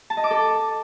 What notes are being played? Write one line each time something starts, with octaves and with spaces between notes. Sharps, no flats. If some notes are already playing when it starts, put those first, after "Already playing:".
A5
D#5
D6
A4